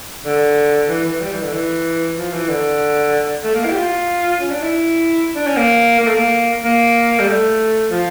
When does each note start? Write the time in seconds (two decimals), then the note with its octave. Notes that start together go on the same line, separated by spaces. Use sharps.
0.25 D3
0.88 E3
1.05 E3
1.21 G3
1.31 E3
1.42 D3
1.52 E3
2.17 F3
2.32 E3
2.49 D3
3.44 A3
3.54 A#3
3.65 E4
3.71 G4
3.76 F4
4.41 C#4
4.51 D4
4.62 E4
5.35 D4
5.47 C#4
5.57 A#3
6.00 A#3
6.07 A3
6.15 A#3
6.64 A#3
7.19 G3
7.27 A3
7.91 F3